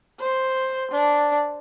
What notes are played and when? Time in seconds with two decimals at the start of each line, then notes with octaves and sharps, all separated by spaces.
0.20 C5
0.91 D4